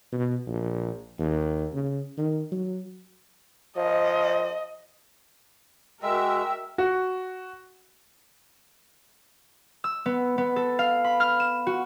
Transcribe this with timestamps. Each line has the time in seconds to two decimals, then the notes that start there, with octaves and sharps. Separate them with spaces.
0.12 B2
0.47 A#1
1.20 D#2
1.74 C#3
2.18 D#3
2.52 F#3
3.77 F3 D#5
6.03 G#3 F#4 A#4 E5 G5
6.78 F#4
9.84 E6
10.06 B3
10.38 B3
10.56 A4
10.79 F5
11.04 B5
11.20 F6
11.40 E7
11.67 F#4